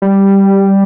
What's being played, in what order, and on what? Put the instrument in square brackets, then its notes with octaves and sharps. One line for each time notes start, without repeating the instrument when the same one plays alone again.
[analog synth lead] G3